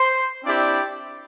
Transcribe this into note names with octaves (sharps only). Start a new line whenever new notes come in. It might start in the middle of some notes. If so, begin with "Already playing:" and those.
Already playing: C5 C6
C4 D4 E4 G4 D5